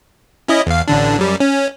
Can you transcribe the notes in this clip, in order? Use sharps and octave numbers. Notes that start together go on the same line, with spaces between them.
C#4 E4 D#5
E2 F5
A1 D3 D4
F#2 G3
C#4